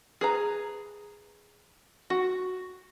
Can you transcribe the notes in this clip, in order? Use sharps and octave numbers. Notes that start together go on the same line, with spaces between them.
G#4 B4 A#5
F#4